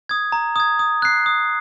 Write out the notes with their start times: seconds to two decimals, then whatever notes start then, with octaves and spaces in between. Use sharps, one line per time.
0.09 D#6 G#6
0.32 A#5
0.56 D#6 G#6
0.79 D#6
1.02 F#6 C7
1.26 D#6